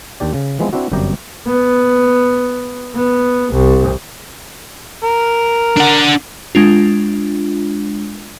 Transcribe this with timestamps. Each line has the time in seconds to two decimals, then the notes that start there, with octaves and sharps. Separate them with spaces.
0.20 D#2 D4 G4 D5
0.34 C#3
0.59 E3 F3 G#3 B3 C4
0.73 C4 D4 E4 F#4
0.92 G1 F#2 C3 G3 G4 A#5
1.47 B3
2.96 B3
3.53 C2
5.04 A#4
5.77 D4 F#5
6.55 G#3 D4 F4